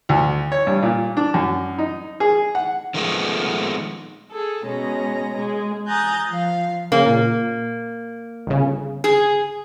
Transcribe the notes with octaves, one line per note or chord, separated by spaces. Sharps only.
D2
C#5
G2
A#2
D4
F#2
D#4
G#4
F#5
D#3 F3 G#3 A3 B3
G#4 A4
B2 G#3 C#4 A#5
G#3
G#5 A#5 D#6 F#6 G6 A6
F3 F5
C#3 A#3
A#2
G1 C#3
G#4